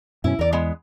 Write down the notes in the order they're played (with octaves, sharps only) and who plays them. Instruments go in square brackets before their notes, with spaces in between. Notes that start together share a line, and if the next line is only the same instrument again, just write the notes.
[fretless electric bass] F#2 B2 C#4 [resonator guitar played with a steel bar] E4
[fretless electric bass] E2 [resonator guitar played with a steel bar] A#4 D5
[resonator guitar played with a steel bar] G#3 B3